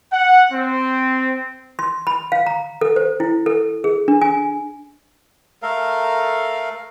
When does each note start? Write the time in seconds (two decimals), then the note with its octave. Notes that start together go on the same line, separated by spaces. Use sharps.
0.13 F#5
0.52 C4
1.79 C6
2.07 B5
2.32 F5
2.46 A#5
2.81 A4
2.96 C5
3.20 E4
3.46 A4
3.84 G#4
4.08 D4
4.21 G#5
5.63 A3 A4 A#4 F5